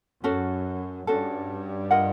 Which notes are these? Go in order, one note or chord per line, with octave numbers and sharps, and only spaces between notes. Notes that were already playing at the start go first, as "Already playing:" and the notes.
F#2 C#4 F#4 A4
G2 C#4 F#4 A4
F4 A#4 D#5 F#5